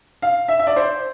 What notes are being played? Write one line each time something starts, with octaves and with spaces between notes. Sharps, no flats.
F5
E5
E5
D5
C5